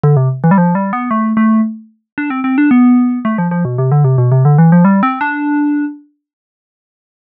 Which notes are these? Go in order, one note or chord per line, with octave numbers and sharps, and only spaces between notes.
D3
C3
E3
G3
F3
G3
B3
A3
A3
D4
C4
C4
D4
B3
A3
F3
F3
B2
C3
D3
C3
B2
C3
D3
E3
F3
G3
C4
D4